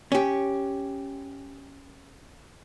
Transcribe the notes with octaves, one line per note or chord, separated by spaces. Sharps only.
C#4 G4